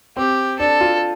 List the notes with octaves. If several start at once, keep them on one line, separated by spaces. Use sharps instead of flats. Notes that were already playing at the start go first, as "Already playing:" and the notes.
C4 G4
D4 A4
F4